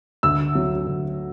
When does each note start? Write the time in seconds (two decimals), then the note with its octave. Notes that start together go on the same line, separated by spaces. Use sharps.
0.23 D2 E6
0.55 F#3
0.87 D2